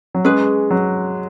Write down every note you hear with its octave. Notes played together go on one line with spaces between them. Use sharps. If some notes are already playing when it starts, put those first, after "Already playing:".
F#3
G#3 C#4 G#4 B4
F#3